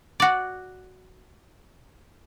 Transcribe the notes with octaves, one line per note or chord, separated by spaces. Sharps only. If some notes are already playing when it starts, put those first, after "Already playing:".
F#4 D5